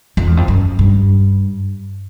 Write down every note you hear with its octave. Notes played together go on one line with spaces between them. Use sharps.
F2
E2
F2
F#2
G2